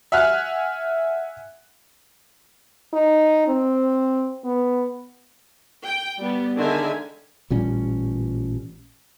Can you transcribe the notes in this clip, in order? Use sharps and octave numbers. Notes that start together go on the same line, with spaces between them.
E5 F#5 G#5 F6 F#6
D#4
C4
B3
G5
G3 B3
D3 D#3 G#3 E5 G#5
A1 A#2 G3 C#4